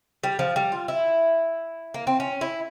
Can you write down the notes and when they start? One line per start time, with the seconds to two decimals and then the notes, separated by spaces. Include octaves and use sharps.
0.23 G3
0.39 F3
0.56 G3
0.72 F4
0.88 E4
1.94 A#3
2.07 C4
2.20 C#4
2.41 E4